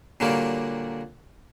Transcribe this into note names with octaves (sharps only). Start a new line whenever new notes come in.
A#2 D3 F#3 G3 A#3